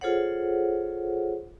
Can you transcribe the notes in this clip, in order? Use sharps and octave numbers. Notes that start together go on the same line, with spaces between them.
F4 G#4 A4 C5 C#5 F#5